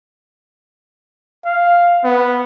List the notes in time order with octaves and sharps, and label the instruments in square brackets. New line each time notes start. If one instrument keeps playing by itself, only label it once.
[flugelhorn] F5
B3